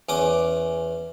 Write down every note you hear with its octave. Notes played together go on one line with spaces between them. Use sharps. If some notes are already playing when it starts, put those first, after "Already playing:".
E2 C#4 D6 D#6